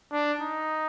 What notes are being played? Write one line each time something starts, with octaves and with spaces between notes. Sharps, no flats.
D4
D#4